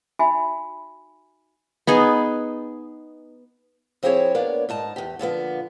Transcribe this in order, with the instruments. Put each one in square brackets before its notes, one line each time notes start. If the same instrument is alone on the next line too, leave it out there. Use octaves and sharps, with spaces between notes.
[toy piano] D#4 F#4 E5 G#5 B5
[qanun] B3 D#4 G#4
[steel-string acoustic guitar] F3 C4 E4 G4 G#4 C#5
A#3 B3 D4 C#5 D5
G#2 D#4 A5
E2 G4
A#2 D3 F3 B3